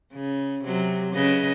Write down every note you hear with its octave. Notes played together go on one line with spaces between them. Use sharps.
C#3
C3 F#3
C#3 B4 D#5